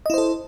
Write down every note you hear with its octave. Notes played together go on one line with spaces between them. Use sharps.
E4 A4 C5 D#5